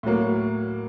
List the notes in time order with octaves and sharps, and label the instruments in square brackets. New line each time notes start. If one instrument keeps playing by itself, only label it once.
[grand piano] A2 F#3 A#3